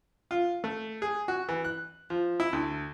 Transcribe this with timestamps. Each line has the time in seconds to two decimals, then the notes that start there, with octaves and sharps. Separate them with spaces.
0.31 F4
0.64 A3
1.02 G#4
1.28 F#4
1.49 E3
1.64 F#6
2.10 F3
2.40 E4
2.53 D2